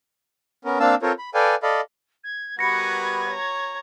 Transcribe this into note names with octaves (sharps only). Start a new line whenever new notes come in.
B3 C#4 A#4
A#3 C4 D4 F5 A5 E6
C4 F4 A4 A#4 C5 C#5
B5
A4 B4 D5 F5 G5 G#5
A4 D5 D#5 F5 B5
G#6
G3 B3 F#4 A#4 B4 G#6 A#6 C#7
C#5 A#5